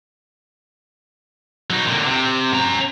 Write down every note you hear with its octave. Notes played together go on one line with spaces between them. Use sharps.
F#3 D#4
A#2 D3
C3
C#4 A#5